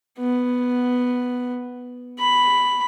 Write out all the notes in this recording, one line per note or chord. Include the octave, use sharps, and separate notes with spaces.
B3
B5